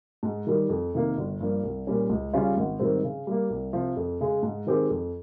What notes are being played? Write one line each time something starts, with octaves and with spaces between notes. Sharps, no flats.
G#2
D#3 G3
F2
C3 D#3 A#3
G1
G2 F3 A#3
C2
A#2 G3 C#4
C#2
C#3 G3 C#4 F4
G#1
G#2 D#3 G3 C4
C#3
G3 A#3
C2
C3 F3
F2
C#3 G#3
G#2
D#3 G#3 C4 G4
F2